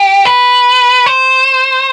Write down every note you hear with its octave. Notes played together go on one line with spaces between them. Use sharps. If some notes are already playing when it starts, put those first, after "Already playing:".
Already playing: G4
B4
C5